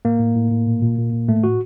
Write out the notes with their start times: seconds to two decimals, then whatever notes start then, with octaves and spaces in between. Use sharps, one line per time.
0.05 A2 A#3
0.19 A2
0.36 A2
0.51 A2
0.67 A#2
0.82 A#2
0.98 A#2
1.13 A#2
1.28 A2 A3
1.43 A2 F#4